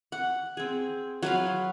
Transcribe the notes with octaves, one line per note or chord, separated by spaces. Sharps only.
F#5
C4 G#4
F#3 B4 F5